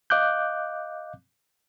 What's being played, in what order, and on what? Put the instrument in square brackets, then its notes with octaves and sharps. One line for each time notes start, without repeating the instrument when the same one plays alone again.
[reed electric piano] D#5 F5 D6 F#6 G6